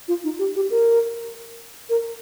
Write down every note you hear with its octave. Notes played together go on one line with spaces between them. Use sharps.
F4
D#4
G4
G4
A#4
A#4